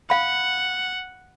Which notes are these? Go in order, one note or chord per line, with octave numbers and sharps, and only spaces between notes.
F5 F#5 B5